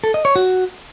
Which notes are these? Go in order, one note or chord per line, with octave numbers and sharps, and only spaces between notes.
A4
D#5
C#5
F#4